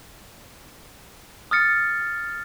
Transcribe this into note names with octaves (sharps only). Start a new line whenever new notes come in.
D#6 F6 A6 C#7